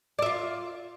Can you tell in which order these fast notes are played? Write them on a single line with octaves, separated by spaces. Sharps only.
D5 E5 F4